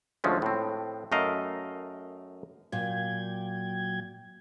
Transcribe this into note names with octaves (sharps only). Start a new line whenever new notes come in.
D2 F3 G#3 A3 C#4
A2 C4
F#2 A3 A#4 D#5 F5
A#2 F#3 G5 G#6